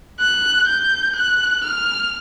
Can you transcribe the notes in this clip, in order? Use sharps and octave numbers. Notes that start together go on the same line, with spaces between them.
F#6
G6
F#6
F6